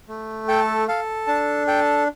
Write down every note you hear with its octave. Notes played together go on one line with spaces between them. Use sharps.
A3
A4 G5
A4 F5
D4 A5
A4 G5